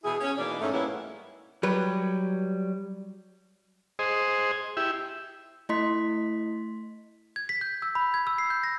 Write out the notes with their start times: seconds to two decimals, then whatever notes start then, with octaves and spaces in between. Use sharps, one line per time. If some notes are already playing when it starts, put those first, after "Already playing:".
0.04 B2 E3 E4 G#4
0.20 C#4
0.37 B2 E3 A#3 D#4 D5
0.60 G#2 A3 C#4
0.72 G3 G#3 A#3 B3 C#4 E4
1.63 F#3 G3 B4
3.99 G#4 C5 D#5
4.77 E4 G4 E5
5.69 A3 E4 D#5 C6 B6
7.36 G#6
7.49 B6
7.61 G6
7.82 E6
7.95 B5
8.14 G#6
8.27 E6
8.38 C7
8.50 G6
8.63 A#6